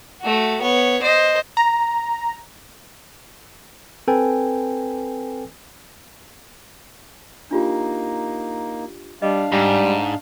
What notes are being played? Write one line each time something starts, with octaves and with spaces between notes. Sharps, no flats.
A3 F#4
B3 C#5
C5 D#5
A#5
C4 A4 B4 G5 G#5
A#3 D4 D#4 F4 G4
G3 D4 D#5 F5
G#2 G3